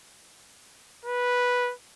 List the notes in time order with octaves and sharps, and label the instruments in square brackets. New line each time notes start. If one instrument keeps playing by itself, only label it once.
[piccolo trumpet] B4